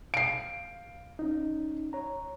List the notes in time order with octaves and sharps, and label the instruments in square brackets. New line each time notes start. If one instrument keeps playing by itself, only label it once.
[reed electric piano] F5 [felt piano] C7 D7
[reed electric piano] C#4 D#4
C#5 A#5